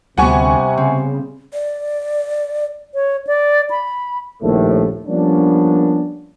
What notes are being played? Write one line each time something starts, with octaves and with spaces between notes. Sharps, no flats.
D2 C3 G3 B3 F#5 G#5 C#6
C#3 C4
D5
C#5
D5
B5
A#1 D#2 A2 A3
F3 G3 A#3 B3 C#4 D4